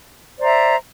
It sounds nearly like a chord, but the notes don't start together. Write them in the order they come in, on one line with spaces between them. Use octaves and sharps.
C5 D5 A#5 E5